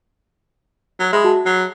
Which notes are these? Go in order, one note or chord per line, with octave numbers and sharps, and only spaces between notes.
F#3
G#3 E5 B5 D#6
F#4 A5
F#3 C7